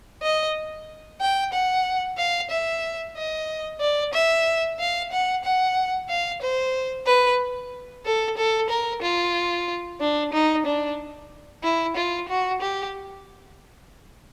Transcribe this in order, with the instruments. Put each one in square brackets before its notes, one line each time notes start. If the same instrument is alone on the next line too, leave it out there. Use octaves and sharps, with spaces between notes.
[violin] D#5
G5
F#5
F5
E5
D#5
D5
E5
F5
F#5
F#5
F5
C5
B4
A4
A4
A#4
F4
D4
D#4
D4
E4
F4
F#4
G4